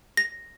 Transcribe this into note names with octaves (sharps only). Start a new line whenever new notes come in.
A#6